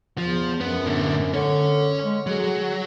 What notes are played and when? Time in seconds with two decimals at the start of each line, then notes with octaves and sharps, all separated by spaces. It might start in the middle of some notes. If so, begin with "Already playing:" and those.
0.18 E2 F3
0.61 F#2 B3
0.86 A2 D3
1.34 D3 C#4 C#5
2.03 G#3
2.27 F#3 G#4